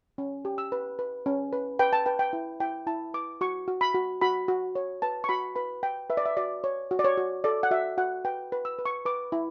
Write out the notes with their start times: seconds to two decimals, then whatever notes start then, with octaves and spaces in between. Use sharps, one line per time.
0.18 C#4
0.45 G4
0.58 E6
0.72 B4
0.99 B4
1.26 C#4
1.53 B4
1.79 B4 G5
1.93 A5
2.06 B4 G5
2.19 G5
2.33 E4
2.60 E4 G5
2.87 E4 A5
3.14 B4 D6
3.41 F#4 C#6
3.68 F#4
3.81 B5
3.95 F#4
4.21 F#4 B5
4.48 F#4
4.75 C#5
5.02 B4 A5
5.24 C#6
5.29 F#4 B5
5.56 B4 B5
5.83 B4 G5
6.10 B4 E5
6.17 D5
6.26 E5
6.37 F#4 D5
6.64 C#5
6.91 F#4
6.99 D5
7.04 C#5
7.18 F#4
7.44 A4 D5
7.63 F#5
7.71 F#4 E5
7.98 F#4 F#5
8.25 B4 G5
8.52 B4
8.65 E6
8.79 B4
8.86 C#6
9.05 B4 D6
9.32 E4